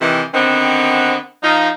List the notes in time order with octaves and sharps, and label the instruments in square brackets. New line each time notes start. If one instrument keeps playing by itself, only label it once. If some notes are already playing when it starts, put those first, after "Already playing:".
[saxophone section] C3 D#3 E3
D3 D#3 B3 C4
F3 D#4